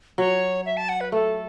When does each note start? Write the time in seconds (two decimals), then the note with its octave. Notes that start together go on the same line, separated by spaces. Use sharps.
0.18 F#3 C#5
0.66 E5
0.77 A5
0.89 F#5
1.01 B4
1.12 A3 A4